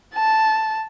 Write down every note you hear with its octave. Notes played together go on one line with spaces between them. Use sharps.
A5